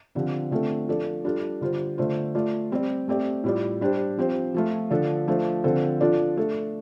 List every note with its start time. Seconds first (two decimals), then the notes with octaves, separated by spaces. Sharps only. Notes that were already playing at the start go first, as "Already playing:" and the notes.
0.15 D3 F3 C4 G4
0.51 D3 A3 C4 F4 A4
0.88 F3 D4 A4 D5
1.24 G3 D4 F4 A4
1.61 D3 G3 F4 C5
1.98 D3 A3 F4 C5
2.35 A3 F4 D5
2.72 G3 C4 G4 D5
3.08 A3 C4 G4 D5
3.44 A2 G3 F4 D5
3.81 G3 D4 G4 C5
4.17 F3 C4 G4 C5
4.54 F3 A3 F4
4.90 D3 F3 D4 A4
5.27 F3 A3 D4 A4 C5
5.64 D3 F3 C4 A4 C5
6.01 F3 D4 F4 A4 D5
6.37 A3 D4 A4